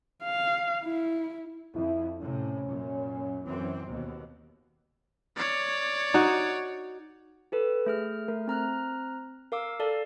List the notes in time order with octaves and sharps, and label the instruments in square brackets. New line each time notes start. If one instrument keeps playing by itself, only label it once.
[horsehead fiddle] F5
E4
[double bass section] F2 [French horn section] E4
[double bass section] A2 C3 [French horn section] C#4
[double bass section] F#2 A#2
F#2 E3 C4
D#2 B2
[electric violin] C#5 D5
[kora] D#4 F#4
[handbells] G4 A4 B4
A3 G#4 F6
A3 A#4
C4 A#5 F6 F#6
A#4 F5 D6 E6
A4 D5 F5 A5